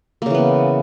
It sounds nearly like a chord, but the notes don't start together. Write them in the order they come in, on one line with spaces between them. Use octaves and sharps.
A#3 C#3 E3 B3